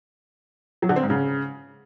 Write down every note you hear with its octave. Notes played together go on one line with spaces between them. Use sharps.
F#3
D3
C4
G#2
C#3